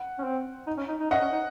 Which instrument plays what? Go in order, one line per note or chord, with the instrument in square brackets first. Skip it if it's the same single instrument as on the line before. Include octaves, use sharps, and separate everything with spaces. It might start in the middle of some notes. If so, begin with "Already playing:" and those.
Already playing: [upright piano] F#5
[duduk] C#4
C4
D#4
C#4
D#4
D#4
[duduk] C#4 [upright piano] D#5 F#5
[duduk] C#4
D#4